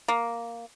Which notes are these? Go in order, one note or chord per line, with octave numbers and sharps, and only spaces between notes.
A#3